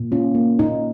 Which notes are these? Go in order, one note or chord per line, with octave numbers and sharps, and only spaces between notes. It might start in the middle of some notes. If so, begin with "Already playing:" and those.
Already playing: A#2
C#4 F4
A#3
A#2 D#4